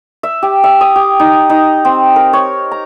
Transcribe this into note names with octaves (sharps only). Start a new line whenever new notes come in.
E5
G4
E5
D#6
G4
D#4
D#4
C4
A#4
C#5
A#5